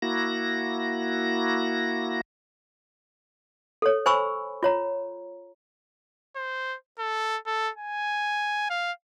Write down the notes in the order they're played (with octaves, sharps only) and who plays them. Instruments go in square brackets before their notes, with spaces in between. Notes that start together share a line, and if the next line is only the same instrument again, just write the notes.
[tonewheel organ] A#3 E4 F#4 A#6
[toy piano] A4 C#5
C5 G#5 B5 C#6 E6
F4 C#5 A#5
[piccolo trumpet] C5
A4
A4
G#5
F5